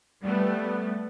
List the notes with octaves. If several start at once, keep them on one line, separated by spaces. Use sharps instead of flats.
G3 A3 B3